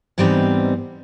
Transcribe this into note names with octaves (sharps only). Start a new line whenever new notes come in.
G#2 E3 G3 B3 C4 D#4